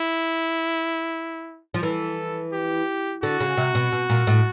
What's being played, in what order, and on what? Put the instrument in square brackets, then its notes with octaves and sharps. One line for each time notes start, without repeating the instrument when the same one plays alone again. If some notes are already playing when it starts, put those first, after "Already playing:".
Already playing: [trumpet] E4
[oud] F3
[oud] E3 [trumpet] A4
[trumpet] G4
[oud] D3 [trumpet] F#4
[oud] C#3
C3
B2
B2
A#2
A2